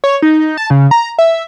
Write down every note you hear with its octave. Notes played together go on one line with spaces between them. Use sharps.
C#5
D#4
A5
C#3
A#5
E5